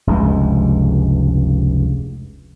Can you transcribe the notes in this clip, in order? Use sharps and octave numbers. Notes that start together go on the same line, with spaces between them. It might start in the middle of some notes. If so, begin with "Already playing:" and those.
F1 C#2 G2 G#3